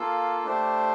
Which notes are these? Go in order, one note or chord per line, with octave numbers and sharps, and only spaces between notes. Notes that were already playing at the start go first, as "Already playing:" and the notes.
Already playing: A#3 F4 A4
A3 D4 G4 C5